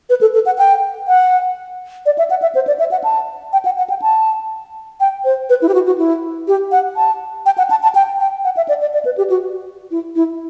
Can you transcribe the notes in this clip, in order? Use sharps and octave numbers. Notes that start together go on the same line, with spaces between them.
B4
A4
A4
F#5
G5
F#5
D5
E5
F#5
E5
C5
D5
E5
F#5
A5
G5
F#5
F#5
G5
A5
G5
C5
B4
E4
G4
F#4
F#4
E4
G4
F#5
A5
G5
F#5
A5
A5
G5
G5
F#5
E5
D5
D5
D5
B4
G4
F#4
E4
E4